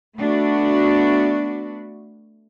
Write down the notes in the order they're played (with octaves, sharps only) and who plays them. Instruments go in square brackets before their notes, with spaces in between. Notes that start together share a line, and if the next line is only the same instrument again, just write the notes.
[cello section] A3 B3 D4 F#4